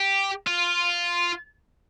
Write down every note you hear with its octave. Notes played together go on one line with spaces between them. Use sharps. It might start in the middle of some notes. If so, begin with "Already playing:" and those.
Already playing: G4
F4